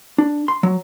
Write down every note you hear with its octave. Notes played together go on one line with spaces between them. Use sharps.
D4
C6
F#3